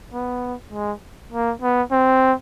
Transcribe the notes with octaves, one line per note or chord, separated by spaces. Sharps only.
B3
G#3
A#3
B3
C4